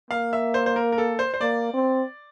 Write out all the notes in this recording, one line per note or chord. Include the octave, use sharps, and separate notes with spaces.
A#3 F5
E5
C5
C5
A#4
A#4
A4
C5
C5
A#3 D5
C4